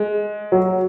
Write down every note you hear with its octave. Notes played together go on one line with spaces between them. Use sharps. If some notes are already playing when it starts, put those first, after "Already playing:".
Already playing: G#3
F#3